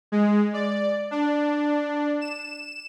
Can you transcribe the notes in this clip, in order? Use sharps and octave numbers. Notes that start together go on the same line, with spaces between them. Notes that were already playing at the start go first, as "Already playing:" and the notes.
G#3
D5
D4
E7